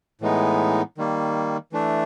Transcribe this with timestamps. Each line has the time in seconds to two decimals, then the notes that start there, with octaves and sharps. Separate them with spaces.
0.21 A2 E3 G#3 B3 D#4
0.98 D#3 G3 A#3
1.72 E3 A3 D4